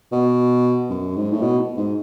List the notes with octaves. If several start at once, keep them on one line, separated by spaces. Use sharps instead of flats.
B2
F#2
G#2
A2
B2
G#2